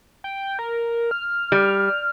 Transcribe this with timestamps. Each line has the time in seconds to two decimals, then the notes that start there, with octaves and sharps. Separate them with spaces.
0.24 G5
0.59 A#4
1.11 F6
1.52 G3